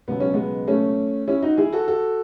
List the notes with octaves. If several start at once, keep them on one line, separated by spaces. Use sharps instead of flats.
C#2 B2 F#3 B3
C#4
G#3 B3
A3 C#4
C#4 E4
D#4 F#4
E4 G#4
F#4 A4
F#4 A4